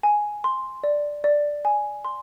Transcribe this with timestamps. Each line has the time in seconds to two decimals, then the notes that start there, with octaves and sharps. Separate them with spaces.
0.03 G#5
0.44 C6
0.84 D5
1.24 D5
1.65 G#5
2.05 C6